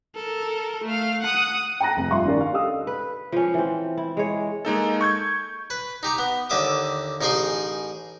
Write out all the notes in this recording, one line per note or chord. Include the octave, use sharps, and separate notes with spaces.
A4 A#4
A3 F5
F#5 D#6
G5 A5 A#5 F#6 A#6
F1
G2 F4 E5 F5 C6 C#6
D#3 C#4 D4 G4 A#4 D5
F5
G4 A4 D#5 F5 D#6 E6
B4
F3 C#4
E3 C4
E4
G#3 C#5
G#3 A#3 D#4 A4
C#6 G6 G#6
B4
D#4 G4 A#5
B3
D#2 D3 E5 D6 D#6
A1 D#4 G#4 G5 G#5 C6